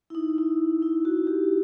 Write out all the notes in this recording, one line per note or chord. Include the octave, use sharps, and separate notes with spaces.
E4
D#4
E4
E4
F#4
G4